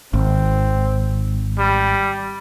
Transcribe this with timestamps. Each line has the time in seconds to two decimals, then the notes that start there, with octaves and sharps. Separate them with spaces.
0.14 G#1 C4
1.58 G3